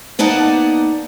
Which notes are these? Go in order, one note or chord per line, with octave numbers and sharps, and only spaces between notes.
A#3 B3 D#4 D5 F#5 A5